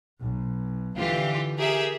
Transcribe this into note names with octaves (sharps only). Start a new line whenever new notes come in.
B1
D3 E3 F4 G4
G4 G#4 A#4 E5